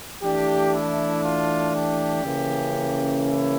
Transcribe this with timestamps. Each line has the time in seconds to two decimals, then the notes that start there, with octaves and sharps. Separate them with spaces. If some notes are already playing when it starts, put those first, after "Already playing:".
0.22 E3 A3 D4 G4
0.74 E4
1.24 F4
1.75 G4
2.25 C#3 E3 A#3 C#4
3.26 E4